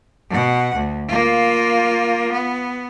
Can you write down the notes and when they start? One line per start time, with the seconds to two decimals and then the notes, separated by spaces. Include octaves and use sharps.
0.30 B2 F#5
0.75 D2
1.08 A#3 F4
2.32 B3